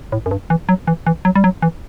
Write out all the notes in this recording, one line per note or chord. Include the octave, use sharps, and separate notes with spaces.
A2
F#2
G2
E3
F#3
E3
E3
F#3
G3
F#3
E3